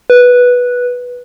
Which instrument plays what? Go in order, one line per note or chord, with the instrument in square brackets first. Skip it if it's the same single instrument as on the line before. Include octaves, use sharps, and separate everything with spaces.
[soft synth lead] B4